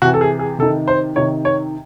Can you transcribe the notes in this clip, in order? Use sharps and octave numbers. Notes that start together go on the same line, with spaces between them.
C3 E3 F#4
A4
G#4
G#4
C3 D#3 A4
C5
C3 D#3 C#5
C#5